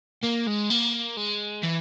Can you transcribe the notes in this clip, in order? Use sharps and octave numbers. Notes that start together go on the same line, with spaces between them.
A#3
G#3
A#3
G#3
E3